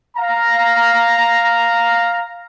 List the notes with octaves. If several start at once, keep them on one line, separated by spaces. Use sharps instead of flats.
F5 A#5